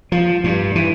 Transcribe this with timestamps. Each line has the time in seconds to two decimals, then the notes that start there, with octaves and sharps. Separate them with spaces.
0.12 F3
0.44 G2
0.75 E3